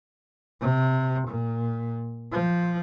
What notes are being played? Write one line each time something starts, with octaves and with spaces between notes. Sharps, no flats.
C3
A#2
F3